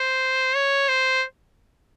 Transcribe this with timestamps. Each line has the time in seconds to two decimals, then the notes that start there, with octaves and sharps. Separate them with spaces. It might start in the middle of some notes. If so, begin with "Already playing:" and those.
Already playing: C5
0.55 C#5
0.88 C5